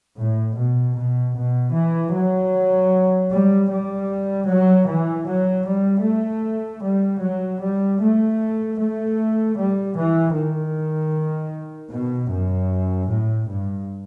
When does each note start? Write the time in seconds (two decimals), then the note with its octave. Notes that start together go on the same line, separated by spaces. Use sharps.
0.17 A2
0.56 B2
0.96 B2
1.35 B2
1.74 E3
2.13 F#3
3.31 G3
3.70 G3
4.49 F#3
4.87 E3
5.27 F#3
5.66 G3
6.04 A3
6.83 G3
7.21 F#3
7.61 G3
8.00 A3
8.79 A3
9.57 G3
9.96 E3
10.35 D#3
11.92 B2
12.31 F#2
13.09 A2
13.48 G2